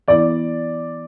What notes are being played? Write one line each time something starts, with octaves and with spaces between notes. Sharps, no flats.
E3 B3 E4 A4 D5